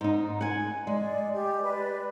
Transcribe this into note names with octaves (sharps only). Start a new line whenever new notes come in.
G#2 D#4
F#5 G#5
G#3 D5
G4
B4 D5